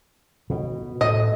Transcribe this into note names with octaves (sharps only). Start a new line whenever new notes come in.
B2
A2 D#5